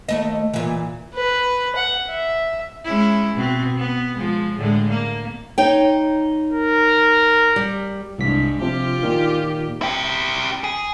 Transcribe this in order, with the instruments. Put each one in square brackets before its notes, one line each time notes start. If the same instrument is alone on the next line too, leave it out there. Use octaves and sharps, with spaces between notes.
[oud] D#2 A3 D#5
A#2 E3
[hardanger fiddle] B4
F#5
E5
[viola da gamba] G#3 C#4 E4
B2 C4
B3
F3 G#3
A2 D3 G#3
A#3
[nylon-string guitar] D#4 C#5 G5
[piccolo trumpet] A#4
[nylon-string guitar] G3
[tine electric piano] C2 B6 [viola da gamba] G2 G#3
[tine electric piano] C3 F3 [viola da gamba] F4 G4
[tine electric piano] A#2 D#3
[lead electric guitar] E4 G4
G#4